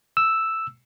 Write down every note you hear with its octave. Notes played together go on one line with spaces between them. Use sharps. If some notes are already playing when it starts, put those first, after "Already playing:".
E6